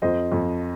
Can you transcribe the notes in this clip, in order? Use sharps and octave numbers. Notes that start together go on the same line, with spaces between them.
F2 C5 D#5
F2